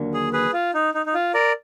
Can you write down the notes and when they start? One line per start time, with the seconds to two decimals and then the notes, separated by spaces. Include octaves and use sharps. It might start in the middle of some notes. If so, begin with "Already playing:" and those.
Already playing: D#2 D3 F#3 A#3 D4
0.14 G#4
0.33 G#4 B4
0.53 F4
0.74 D#4
0.94 D#4
1.06 D#4
1.14 F4
1.34 A#4 D5